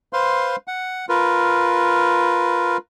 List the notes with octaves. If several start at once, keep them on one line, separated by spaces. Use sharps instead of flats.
B4 C5 F5 C6
F#5
F4 A#4 B4